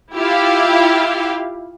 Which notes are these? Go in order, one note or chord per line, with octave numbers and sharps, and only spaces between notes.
E4 F4 G4 F5